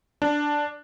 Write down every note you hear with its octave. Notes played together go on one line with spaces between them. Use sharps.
D4